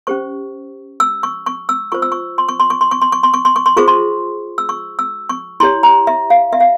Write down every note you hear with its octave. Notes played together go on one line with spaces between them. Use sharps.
C#4 G4 C5 C#6
E6
C#6
C#6
E6
F4 C5 C#6
E6
C#6
C6
C#6
C6
C#6
C6
C#6
C6
C#6
C6
C#6
C6
C#6
C6
F4 G#4 C5 C#6
C6
E6
C#6
E6
C#6
E4 G4 C#5 C6
A#5
E5
F5
E5
F5